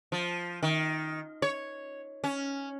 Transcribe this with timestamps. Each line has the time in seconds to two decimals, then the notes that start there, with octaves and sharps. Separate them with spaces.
0.12 F3
0.63 D#3
1.42 C#5
2.24 C#4